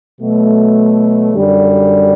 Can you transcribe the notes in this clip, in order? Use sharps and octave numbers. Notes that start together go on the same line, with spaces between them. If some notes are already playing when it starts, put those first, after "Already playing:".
B2 F#3 A3
F#2 D3 G3